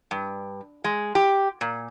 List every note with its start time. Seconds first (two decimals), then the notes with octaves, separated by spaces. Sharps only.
0.11 G2
0.84 G#3
1.15 G4
1.61 A#2